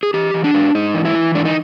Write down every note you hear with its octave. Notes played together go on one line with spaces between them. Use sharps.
G#4
E3 G4
E3
D4
G#2
G#2 D#4
E3
E4
E3
G#2 D4
D#4